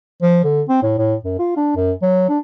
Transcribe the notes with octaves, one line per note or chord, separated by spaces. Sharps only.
F3
D3
C4
A2
A2
F#2
F4
D4
F#2
F#3
D4